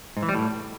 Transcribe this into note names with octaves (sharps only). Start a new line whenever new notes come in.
G#2
E3
G3
A2